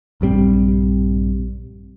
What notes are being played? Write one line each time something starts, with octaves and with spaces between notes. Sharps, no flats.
A#1 G2 G3 C4